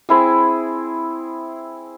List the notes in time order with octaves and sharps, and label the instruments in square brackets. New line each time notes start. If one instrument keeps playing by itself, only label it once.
[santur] C4 E4 G#4